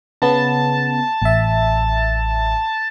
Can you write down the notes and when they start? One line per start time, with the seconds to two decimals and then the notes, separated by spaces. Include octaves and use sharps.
0.22 C#3 B3 A5
1.22 A1 E5